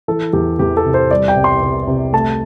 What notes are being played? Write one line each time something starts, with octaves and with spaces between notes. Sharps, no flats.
E3 A4
E2 G4
E2 G4
A4
C3
C5
G3 D5
G5
C2
C6
C2
C3
A3 A5